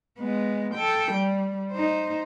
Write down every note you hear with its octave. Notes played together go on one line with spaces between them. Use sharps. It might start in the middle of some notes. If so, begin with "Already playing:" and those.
G#3 B3
A4 G5
G3
D#4 C5